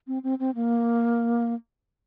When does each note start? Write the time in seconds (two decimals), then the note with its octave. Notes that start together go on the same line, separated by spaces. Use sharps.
0.07 C4
0.23 C4
0.39 C4
0.55 A#3